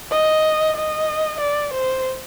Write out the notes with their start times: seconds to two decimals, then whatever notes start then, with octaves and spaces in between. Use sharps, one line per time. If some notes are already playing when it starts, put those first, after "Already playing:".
0.11 D#5
0.77 D#5
1.41 D5
1.74 C5